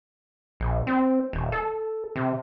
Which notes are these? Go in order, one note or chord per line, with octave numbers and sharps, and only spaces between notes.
A#1
C4
D#1
A4
C3